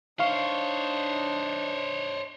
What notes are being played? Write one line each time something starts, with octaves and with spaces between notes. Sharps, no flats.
D4 D#4 C5 C#5 F5 C#6